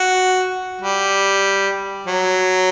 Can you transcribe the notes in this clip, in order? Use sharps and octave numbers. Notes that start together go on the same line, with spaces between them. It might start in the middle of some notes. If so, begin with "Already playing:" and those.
Already playing: F#4
G3
F#3